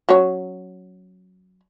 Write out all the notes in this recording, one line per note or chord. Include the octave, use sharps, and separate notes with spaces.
F#3 C#4 C#5